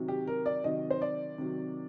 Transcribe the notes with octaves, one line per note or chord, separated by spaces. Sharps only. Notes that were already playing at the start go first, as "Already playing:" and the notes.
Already playing: C3 D#3 F#3
G4
A#4
D5
C3 D#3 F#3 D#5
C5
D5
C3 D#3 F#3